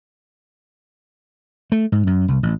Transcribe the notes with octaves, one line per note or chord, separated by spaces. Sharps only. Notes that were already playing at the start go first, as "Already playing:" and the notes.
A3
G#2
F#2
C2
A1